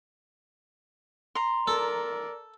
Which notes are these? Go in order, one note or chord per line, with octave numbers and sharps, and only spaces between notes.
A#5 C6
A4 A#4 D5